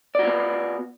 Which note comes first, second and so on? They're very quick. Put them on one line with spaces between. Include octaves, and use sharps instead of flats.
D5 F#4 F4 B3